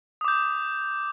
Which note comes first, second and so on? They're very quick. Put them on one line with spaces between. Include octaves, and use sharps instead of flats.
D#6 D6 G6